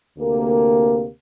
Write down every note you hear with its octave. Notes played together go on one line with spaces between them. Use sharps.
D2 C3 A#3 G4